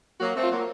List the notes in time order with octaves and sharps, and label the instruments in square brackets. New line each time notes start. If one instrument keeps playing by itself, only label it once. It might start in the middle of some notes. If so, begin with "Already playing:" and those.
[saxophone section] F#3 A#3 [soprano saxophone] F#4
[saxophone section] A3 C4
[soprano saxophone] F4
[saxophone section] F#3 A#3